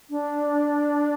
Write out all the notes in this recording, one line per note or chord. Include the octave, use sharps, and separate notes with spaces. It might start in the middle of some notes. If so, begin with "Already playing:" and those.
D4